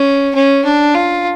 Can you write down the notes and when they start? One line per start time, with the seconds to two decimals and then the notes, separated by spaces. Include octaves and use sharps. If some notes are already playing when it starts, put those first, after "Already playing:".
Already playing: C#4
0.35 C#4
0.64 D4
0.95 F4